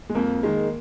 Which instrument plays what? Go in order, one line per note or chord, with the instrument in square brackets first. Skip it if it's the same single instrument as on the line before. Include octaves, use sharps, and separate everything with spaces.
[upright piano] G#3
[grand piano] F2 [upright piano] A#3
[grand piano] D#3 G#3